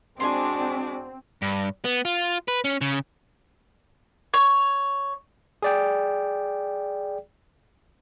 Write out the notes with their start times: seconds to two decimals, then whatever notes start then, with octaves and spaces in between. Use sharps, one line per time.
0.20 G#3 C4 D4 F#4 D5 G#5 C6
1.42 G2
1.85 B3
2.05 F4
2.48 B4
2.64 C#4
2.81 C#3
4.34 C#5
5.62 G#4 D5 G5